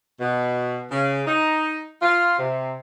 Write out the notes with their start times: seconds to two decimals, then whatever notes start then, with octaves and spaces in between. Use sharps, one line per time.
0.20 B2
0.91 C#3
1.27 D#4
2.02 F4
2.38 C3